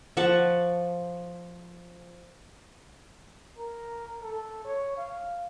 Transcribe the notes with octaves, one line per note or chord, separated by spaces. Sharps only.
F3 F#5 A5 C#6
A#4
A4
C#5
F5